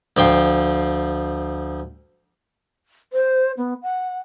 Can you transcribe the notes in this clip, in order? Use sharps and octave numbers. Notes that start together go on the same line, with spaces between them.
D2 F3 G5 C6
C5
B3
F#5